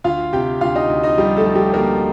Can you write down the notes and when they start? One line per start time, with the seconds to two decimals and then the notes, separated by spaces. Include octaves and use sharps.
0.04 D2 F4 F5
0.33 C3 G4 G5
0.61 D2 F4 F5
0.75 D#4 D#5
0.89 D2
1.03 D#4 D#5
1.18 F3 G3 G4
1.36 A3 A4
1.46 F3
1.55 G3 G4
1.74 D2 A#3 A#4